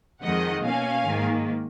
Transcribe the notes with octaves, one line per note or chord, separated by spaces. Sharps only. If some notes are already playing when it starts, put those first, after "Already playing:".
F2 D#3 G#3 D#5 F#5
B2 A#3 C#4 F5 G#5
G#2 D#3 A#3